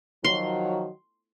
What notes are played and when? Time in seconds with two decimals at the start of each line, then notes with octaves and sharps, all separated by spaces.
0.25 D#3 F3 F#3 C6